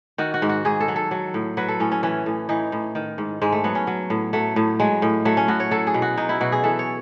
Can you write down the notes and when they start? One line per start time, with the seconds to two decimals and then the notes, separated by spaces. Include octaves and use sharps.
0.18 D#3 F#4
0.34 F#4
0.42 G#2
0.49 F#4
0.65 G#2 G#4
0.80 A4
0.88 F#3
0.96 A4
1.11 F#3
1.34 A2
1.57 F#3 B4
1.68 A4
1.80 A2 C#4
1.92 C#4
2.03 E3 C#4
2.26 A2
2.49 E3 D#4
2.72 A2
2.95 D#3
3.18 G#2
3.42 G#2 G#3
3.52 A3
3.64 F#3 B3
3.75 C#4
3.87 F#3
4.10 A2
4.33 F#3 A3
4.56 A2
4.80 F#3 G#3
5.02 A2
5.25 F#3 A3
5.37 C#4
5.48 A2 F#4
5.60 C#5
5.71 F#3 A4
5.87 G#4
5.94 B2
6.02 F#4
6.17 F#3 D#4
6.29 E4
6.41 B2 F#4
6.52 G#4
6.63 E3 A4
6.79 C#5